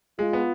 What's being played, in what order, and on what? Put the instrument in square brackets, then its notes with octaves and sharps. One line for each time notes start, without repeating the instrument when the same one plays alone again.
[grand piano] G#3 [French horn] F4
[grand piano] B3